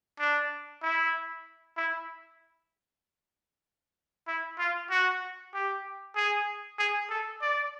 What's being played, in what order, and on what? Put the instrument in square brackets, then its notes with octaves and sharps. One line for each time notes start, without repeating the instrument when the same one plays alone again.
[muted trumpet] D4
E4
E4
E4
F4
F#4
G4
G#4
G#4
A4
D5